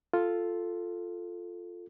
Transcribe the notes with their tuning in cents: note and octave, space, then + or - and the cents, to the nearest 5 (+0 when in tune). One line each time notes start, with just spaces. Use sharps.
F4 +0 A4 +0